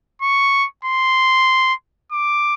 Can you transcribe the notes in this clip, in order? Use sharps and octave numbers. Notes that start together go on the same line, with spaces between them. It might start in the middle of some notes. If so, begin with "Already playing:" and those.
C#6
C6
D6